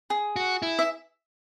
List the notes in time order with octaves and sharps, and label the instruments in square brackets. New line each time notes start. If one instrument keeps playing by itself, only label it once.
[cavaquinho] G#4
[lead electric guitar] F#4
E4
[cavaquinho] E5